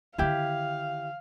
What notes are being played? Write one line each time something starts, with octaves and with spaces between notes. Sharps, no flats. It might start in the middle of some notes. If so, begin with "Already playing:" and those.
D3 D#3 E4 G4 F5